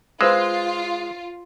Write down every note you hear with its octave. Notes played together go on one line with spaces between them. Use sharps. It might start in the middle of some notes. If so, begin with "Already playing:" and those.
G#3 F4 B4 C5 E6